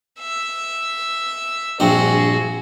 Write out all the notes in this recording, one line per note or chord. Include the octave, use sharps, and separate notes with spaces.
E5
A#1 G2 C4 F#4 G#4